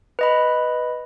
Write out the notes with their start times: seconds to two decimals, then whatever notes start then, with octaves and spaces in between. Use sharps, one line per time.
0.19 B4 D#5 B5